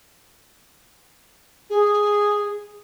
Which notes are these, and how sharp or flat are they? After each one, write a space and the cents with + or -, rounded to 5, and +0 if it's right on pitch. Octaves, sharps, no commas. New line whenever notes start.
G#4 -5